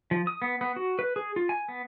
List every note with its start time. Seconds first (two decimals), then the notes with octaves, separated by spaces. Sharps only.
0.11 F3
0.27 D#6
0.42 B3
0.61 B3
0.76 F#4
0.99 B4
1.16 G#4
1.36 F4
1.49 G#5
1.68 B3